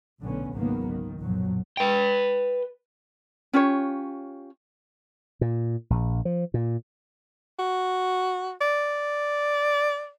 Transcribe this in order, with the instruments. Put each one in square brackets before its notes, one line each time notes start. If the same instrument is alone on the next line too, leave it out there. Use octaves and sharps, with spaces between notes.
[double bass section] B1 A2 D3 B3 C#4
G#1 C#2 D#3 F#3 A#3 B3
D#3
B1 F#2 A#2 F3 F#3
[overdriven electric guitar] B4 G5
[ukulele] C#4 F4 G4 C#5
[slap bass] A#2
A#1
F3
A#2
[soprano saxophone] F#4
D5